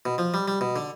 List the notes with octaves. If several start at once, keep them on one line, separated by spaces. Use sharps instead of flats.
B2
F3
G3
G3
B2
D3